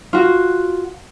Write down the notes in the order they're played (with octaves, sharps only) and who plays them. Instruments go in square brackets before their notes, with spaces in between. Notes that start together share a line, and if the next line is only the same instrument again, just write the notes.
[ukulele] F4 F#4